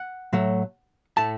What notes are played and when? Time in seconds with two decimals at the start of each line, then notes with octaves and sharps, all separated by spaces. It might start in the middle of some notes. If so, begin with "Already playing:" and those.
Already playing: F#5
0.33 A2 F#3 A3
1.17 A2 A3 A5